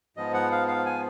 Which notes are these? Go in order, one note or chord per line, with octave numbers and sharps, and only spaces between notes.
G#2 F3 B3 D#5
F#5
F5
F5
G#5